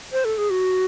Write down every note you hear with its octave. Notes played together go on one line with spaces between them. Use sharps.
C5
A4
G#4
F#4